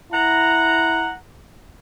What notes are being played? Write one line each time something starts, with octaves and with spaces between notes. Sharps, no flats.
E4 F#5 A#5